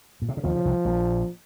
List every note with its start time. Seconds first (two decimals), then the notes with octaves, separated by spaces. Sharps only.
0.22 A#2
0.29 C3
0.37 C#3
0.44 D#2 D#3 F3
0.55 C#3
0.65 C2 C3
0.85 A#1 A#2